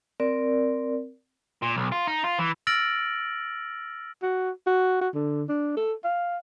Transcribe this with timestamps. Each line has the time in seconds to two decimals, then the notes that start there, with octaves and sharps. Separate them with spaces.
0.20 C4 A#4 D5
1.62 A#2
1.77 B1
1.92 F4
2.07 D#4
2.24 F4
2.39 E3
2.67 E6 F6 A6 A#6 D7 F#7
4.23 F#4
4.67 F#4
5.01 F#4
5.14 D3
5.49 D4
5.77 A4
6.04 F5